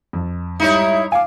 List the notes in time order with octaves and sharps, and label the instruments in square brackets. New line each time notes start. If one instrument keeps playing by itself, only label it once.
[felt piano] F2
[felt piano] G#2 G3 [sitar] D#4 E4 C#5 [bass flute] E5
[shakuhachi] F5 [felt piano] G#5 D6